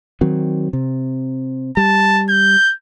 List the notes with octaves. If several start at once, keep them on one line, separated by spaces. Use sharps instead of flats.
D#3 F#3 C4
C3
G3 A5
G6